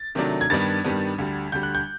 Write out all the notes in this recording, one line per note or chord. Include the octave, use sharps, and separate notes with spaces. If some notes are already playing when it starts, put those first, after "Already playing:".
Already playing: A6
C3 D#3 F#3 A3 D4
G#6
G2 D#3 G3 B3 D4 A6
G2 D#3 G3 B3 D4
D2 D3 G3
D2 D3 G3 G6
F#6
G6